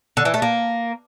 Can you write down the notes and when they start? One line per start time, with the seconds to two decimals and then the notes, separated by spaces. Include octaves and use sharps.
0.17 D3
0.25 E3
0.34 A3
0.42 A#3